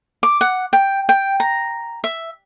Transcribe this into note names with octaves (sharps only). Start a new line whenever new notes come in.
D6
F#5
G5
G5
A#5
E5